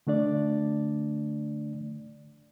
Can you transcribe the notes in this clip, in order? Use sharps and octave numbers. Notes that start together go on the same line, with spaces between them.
D3 A3 D4 D5